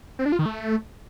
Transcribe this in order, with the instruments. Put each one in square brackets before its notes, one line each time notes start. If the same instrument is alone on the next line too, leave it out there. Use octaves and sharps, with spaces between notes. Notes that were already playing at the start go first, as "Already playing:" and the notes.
[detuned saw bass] C4
D4
F4
D#3
A3